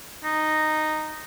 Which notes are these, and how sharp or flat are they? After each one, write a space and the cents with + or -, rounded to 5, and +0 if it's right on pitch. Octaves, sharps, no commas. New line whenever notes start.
D#4 -10